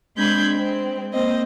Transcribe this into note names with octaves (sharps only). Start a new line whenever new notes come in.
G#3 C4 D4 B5 G6 G#6
G#3 C4
A#3 C4 C5 D#5